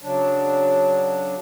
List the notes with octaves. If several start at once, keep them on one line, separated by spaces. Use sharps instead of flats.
C#3 F#3 D4